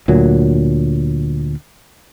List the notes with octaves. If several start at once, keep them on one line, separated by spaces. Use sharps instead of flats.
D2 A#2 F#3